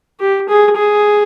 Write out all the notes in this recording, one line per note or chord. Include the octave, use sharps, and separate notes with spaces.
G4
G#4
G#4